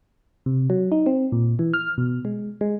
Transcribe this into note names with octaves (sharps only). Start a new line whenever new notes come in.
C3
F#3
D#4
C4
A#2
E3
F6
B2
G#3
G#3